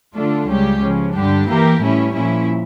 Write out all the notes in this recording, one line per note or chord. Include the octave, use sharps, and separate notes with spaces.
D3 A3 D4 F4 A4
C#2 C#3 G3 C#4 G4
C#3 F3 C#4
G2 D3 G3 D4 G4
E3 A#3 E4 G4 A#4
A2 E3 G3 C#4 E4
A#2 F3 C#4 E4